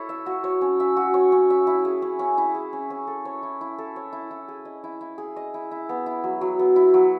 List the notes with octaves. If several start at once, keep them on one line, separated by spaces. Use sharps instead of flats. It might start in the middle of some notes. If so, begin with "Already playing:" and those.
Already playing: E4 A4 C#5
E5
F#4
C#5
C#4
E5
F#4
C#5
C#4
E5
E4
G#4
C#4
C#4
E4
G#4
C#4
C#4
A4
C#5
E4
E4
A4
C#5
E4
E4
G#4
D#5
E4
E4
G#4
D#5
E4
E4
B3
E4
F#3
F#3
B3
E4
F#3